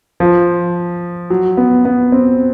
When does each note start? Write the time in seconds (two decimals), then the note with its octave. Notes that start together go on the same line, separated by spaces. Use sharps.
0.20 F3
1.30 F#3
1.57 B3
1.85 B3
2.12 C4